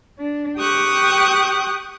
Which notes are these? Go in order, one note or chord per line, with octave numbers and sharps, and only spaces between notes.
D4
G4 G5 C#6 D#6 F#6